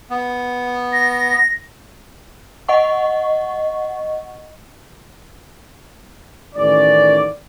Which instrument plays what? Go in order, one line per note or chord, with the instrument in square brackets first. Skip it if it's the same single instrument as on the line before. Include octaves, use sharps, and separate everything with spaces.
[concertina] B3
[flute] A#6
[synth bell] D#5 F#5 C#6
[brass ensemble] A1 D#3 C#4 C#5 D5